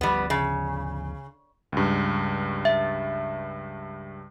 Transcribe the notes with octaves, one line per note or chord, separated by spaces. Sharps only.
D2 F3 G3 B3
C#3
C#2 G2
E5